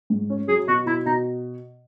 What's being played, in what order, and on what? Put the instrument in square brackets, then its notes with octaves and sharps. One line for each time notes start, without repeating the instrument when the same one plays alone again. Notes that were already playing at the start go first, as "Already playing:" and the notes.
[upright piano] G#2
C#4
[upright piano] F#3 [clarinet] G#4
[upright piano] B2 [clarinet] F#4
[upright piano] B2 [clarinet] E4
[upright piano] B2 [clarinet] D#4